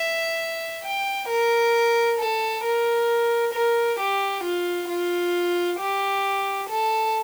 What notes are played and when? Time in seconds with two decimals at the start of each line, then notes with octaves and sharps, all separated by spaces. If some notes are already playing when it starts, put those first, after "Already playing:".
Already playing: E5
0.84 G5
1.28 A#4
2.19 A4
2.64 A#4
3.54 A#4
3.99 G4
4.44 F4
4.89 F4
5.80 G4
6.69 A4